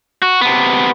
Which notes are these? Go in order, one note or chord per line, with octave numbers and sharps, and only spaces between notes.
F#4
C3 B3